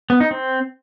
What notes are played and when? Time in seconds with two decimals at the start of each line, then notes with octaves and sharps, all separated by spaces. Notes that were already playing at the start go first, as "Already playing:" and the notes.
0.10 B3
0.20 D#4
0.31 C4